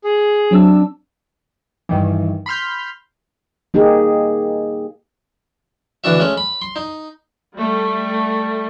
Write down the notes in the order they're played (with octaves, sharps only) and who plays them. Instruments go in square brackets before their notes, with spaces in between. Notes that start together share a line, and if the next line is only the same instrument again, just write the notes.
[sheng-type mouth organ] G#4
[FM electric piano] F#3 C4 E6 [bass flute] D4
[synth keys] G2 D#3 E3
B5 C6 F6 G6
[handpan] A#3 D#4 G4 G#4
[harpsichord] D2 E3 D4 F#4 E5
G#3 A3 C#4
B5
C6
D#4
[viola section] G3 A3